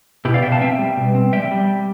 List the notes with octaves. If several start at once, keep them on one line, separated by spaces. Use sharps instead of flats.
B2 E4 G4
D5 F5
B2 E5 G5
F5 A5
C4 E5 G5
G3
B2
C4
G3 E5 G5
G3